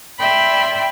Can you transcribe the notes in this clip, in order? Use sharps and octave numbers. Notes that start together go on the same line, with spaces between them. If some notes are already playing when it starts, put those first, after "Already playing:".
D5 E5 G5 B5 C6